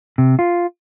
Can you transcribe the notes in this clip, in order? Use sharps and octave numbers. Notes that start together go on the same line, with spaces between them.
C3
F4